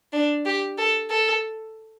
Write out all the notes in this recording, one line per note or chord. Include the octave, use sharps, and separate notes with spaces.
D4
G4
A4
A4